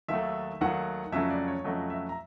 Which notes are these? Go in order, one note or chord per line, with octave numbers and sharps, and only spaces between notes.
D#2 D#3 F#3 A3 E5
D#2 D#3 F#3 A3 F#5
F2 C#3 F#3 A3 E5
D5
C#5
F2 C#3 F#3 A3 D#5
E5
A#5